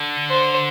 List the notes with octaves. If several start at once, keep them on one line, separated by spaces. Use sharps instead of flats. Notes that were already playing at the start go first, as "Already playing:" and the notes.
Already playing: D3
C5